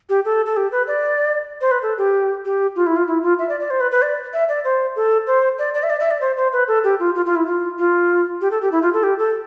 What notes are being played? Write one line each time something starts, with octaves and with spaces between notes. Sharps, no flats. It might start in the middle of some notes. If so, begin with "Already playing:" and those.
G4
A4
A4
G4
B4
D5
C5
B4
A4
G4
G4
F4
E4
F4
E4
F4
E5
D5
D5
C5
B4
B4
D5
E5
D5
C5
A4
C5
D5
D5
E5
D5
E5
D5
C5
C5
B4
A4
G4
F4
F4
F4
E4
F4
F4
G4
A4
G4
E4
F4
A4
G4
A4